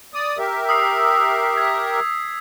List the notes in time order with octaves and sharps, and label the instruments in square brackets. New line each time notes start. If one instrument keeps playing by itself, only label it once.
[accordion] D5 D#6
G4 A#4 E5
[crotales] D#6 E6 C7
G#6 B6